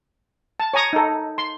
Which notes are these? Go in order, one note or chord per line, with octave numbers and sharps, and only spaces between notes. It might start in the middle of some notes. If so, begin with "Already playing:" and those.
A5
C#5 G#5 A#5 D#6
D#4 A4
C6